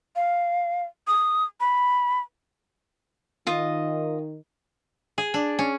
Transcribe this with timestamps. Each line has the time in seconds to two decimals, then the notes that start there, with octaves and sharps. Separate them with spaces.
0.16 F5
1.07 D#6
1.60 B5
3.47 D#3 F4 D#5
5.18 G#4
5.34 D4
5.59 C#4